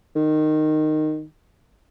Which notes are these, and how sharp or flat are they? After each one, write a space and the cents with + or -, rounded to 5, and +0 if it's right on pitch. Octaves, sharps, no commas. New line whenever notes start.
D#3 -15